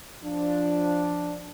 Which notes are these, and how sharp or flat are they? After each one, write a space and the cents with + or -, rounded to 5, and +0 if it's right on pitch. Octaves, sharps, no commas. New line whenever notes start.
F3 +0 D4 +0